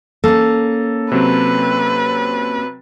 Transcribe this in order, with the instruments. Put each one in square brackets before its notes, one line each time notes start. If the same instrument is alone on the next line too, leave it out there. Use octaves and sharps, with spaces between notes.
[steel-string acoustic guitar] A#3 C#4 [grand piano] A4
[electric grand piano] C3 F#3 C4 [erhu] B4